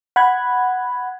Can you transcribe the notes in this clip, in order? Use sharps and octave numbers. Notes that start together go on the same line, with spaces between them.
F#5 B5 F#6 G#6